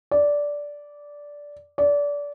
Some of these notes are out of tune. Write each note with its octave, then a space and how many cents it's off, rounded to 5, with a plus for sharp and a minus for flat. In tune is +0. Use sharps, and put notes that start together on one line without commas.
D5 -10
D5 -25